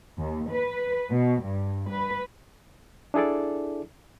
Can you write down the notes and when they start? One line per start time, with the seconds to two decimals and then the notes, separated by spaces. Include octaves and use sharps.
0.17 D#2
0.51 B4
1.11 B2
1.44 G2
1.91 B4
3.14 D4 E4 G#4 A4 D5